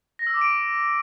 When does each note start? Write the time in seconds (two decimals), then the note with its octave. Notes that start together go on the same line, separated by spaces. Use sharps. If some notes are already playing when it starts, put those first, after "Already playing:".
0.19 A#6
0.27 E6
0.34 D6
0.41 D7